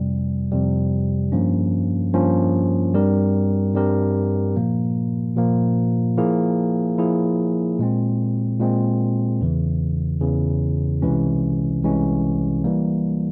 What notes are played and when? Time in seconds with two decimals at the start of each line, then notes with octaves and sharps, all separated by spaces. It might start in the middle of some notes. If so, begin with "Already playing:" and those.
Already playing: F2 C3 G3
0.51 F2 C3 G3
1.32 G2 F3 A#3 C#4
2.13 G2 F3 A#3 C#4
2.94 G2 G3 C4 G4 A#4
3.74 G2 G3 C4 G4 A#4
4.56 A#2 F3 A#3
5.36 A#2 F3 A#3
6.17 F3 A#3 E4 G#4
6.98 F3 A#3 E4 G#4
7.79 A#2 G#3 C4
8.60 A#2 G#3 C4
9.41 E2 C#3 E3
10.21 E2 C#3 E3
11.02 C2 C3 E3 G#3 C#4
11.83 C2 C3 E3 G#3 C#4
12.64 E3 G3 A#3